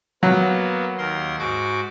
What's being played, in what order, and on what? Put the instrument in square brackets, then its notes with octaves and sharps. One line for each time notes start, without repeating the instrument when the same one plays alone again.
[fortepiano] F#3 [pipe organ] A#3 B3
[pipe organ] D#2 A#4 C6
G#2 F#4 D6